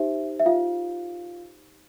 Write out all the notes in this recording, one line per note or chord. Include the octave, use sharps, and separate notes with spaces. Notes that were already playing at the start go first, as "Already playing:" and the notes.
Already playing: D#4 G4 C5 E5
E5
F4 F5